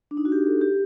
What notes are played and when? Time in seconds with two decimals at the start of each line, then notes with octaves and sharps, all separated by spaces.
0.11 D4
0.17 D#4
0.25 F#4
0.32 G4
0.47 A4
0.61 G4